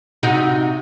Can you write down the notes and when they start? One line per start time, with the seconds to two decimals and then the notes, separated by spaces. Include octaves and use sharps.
0.23 C3 D#4 F#4